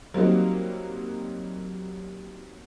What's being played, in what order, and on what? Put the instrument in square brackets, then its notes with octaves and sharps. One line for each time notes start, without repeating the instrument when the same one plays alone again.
[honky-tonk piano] F#3 G3 A#3 C4 D#4 F#4